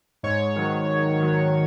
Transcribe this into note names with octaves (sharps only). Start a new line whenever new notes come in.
G#2 C#5
D#3 F#3
G#2
D#3 F#3